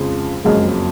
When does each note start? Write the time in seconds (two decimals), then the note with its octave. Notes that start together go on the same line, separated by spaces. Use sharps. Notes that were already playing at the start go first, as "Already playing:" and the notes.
Already playing: F2 C#3 F3 G#3
0.45 F#1 F2 C#3 F#3 G#3 A#3